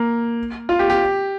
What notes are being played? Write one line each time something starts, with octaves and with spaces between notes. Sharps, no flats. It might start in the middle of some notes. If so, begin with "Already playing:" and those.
Already playing: A#3
F4
G4
G4